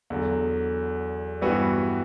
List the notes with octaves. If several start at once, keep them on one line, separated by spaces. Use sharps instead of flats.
E2 D3 F#3
G2 E3 G3 B3 F#4